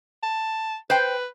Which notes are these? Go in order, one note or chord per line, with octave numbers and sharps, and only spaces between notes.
A5
B4 C5 G5